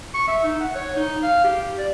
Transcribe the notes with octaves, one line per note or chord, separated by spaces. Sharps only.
C#6
E5
D#4
F#5
C#5
D#4
F5
G4
D5